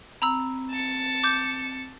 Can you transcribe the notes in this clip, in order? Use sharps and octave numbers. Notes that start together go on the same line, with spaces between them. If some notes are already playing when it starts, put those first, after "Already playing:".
C4 A#5 B5 E6
A5 C#7
D6 G6